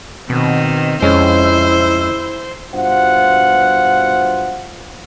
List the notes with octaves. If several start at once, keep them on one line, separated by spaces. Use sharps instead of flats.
B2 D#3 C4
F2 G#3 C#4 E4 C5
G2 B2 F4 C5 F#5